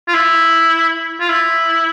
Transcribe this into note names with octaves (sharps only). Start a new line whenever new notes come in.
F4
E4
F4
E4